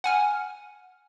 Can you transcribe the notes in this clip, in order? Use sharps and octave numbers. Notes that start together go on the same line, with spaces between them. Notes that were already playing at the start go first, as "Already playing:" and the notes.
F#5 G#5 F6